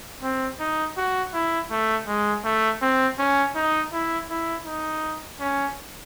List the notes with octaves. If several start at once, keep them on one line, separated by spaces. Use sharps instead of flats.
C4
D#4
F#4
E4
A3
G#3
A3
C4
C#4
D#4
E4
E4
D#4
C#4